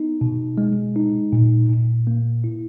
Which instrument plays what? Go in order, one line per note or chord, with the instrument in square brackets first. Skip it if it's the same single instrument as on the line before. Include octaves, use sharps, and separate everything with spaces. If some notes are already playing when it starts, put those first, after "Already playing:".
Already playing: [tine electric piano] B3 D#4
B2
G#3
D#4
A#2
A#2
A#3
E4